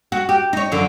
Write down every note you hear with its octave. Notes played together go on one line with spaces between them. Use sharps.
F#4
G4
D#4 C#5
F#2 D3 F3